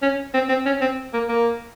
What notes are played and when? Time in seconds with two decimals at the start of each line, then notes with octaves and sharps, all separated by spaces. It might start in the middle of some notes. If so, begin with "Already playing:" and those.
0.02 C#4
0.34 C4
0.49 C4
0.66 C#4
0.81 C4
1.13 A#3
1.29 A#3